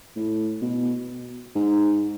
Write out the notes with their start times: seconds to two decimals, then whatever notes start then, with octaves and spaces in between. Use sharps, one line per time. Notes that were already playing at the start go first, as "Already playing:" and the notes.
0.16 A2
0.62 B2
1.55 G#2